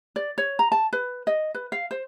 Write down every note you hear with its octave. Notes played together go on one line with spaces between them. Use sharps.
D5
C#5
A#5
A5
B4
D#5
B4
F5
C5